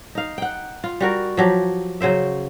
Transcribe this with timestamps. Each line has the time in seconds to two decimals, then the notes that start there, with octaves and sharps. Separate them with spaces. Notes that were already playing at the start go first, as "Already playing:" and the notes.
0.15 D#4 F5
0.38 F#5 G5
0.84 F4
1.00 G3 F#4 A#4
1.37 F3 F#3 G4
2.01 C#3 F#3 C5 E5